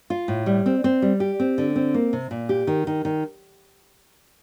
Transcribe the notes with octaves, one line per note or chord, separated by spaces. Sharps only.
F4
A2
G3
C4
C4
G3
G4
C4
D3
C4
A#3
C3
A#2
G4
D#3
D#3
D#3